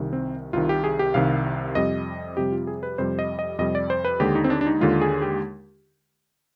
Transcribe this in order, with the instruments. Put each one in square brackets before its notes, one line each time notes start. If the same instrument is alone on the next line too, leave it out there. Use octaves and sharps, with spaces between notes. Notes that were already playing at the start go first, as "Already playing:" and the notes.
Already playing: [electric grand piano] C2 C3 D#3
C4
C2 C3 D#3 F4
G4
G#4
G4
C2 C3 D#3 F5
F2 C3 G3 D#5
F2 C3 G3 G4
F4
G#4
B4
F2 C3 G3 C5
D#5
D#5
F2 C3 G3 D#5
D5
C5
B4
D#2 D3 G#3 G4
D#4
C4
D4
D4
D#4
D#2 D3 G#3 F4
G#4
G4